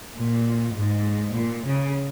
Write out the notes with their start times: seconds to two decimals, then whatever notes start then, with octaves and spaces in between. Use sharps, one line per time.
0.15 A#2
0.75 G#2
1.34 A#2
1.65 C#3